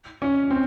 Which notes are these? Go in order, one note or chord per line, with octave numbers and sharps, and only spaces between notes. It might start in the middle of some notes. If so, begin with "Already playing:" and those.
C#4
C4